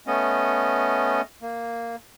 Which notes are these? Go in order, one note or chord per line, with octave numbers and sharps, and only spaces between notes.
A3 B3 C#4 D#5
A#3